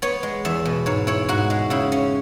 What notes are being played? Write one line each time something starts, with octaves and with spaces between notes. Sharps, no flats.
B3 C#5
G#3
E2 E5
B2
G#2 C#5
E4 C#5
G#2 F#4
G#3
C#3 E4
C#4